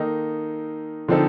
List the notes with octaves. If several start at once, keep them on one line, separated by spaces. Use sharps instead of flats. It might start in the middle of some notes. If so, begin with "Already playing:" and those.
Already playing: D#3 A#3 D#4 A4
D3 F3 C4 D#4 A4